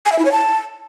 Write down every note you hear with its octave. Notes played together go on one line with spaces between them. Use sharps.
G#5
E5
E4
C#5
A5